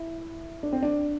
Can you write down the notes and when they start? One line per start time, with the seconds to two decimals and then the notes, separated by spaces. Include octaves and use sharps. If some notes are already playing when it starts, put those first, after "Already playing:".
Already playing: E4
0.63 D4
0.72 C4
0.83 D4